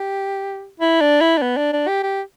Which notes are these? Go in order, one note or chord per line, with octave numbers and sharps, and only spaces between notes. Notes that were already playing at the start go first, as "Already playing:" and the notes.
Already playing: G4
E4
D4
E4
D4
B3
D4
D4
G4
G4